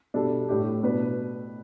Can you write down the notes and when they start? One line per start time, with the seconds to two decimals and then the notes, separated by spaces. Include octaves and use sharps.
0.14 B2 G3 D4 A4
0.48 A2 A3 D4 G4
0.83 B2 B3 D4 B4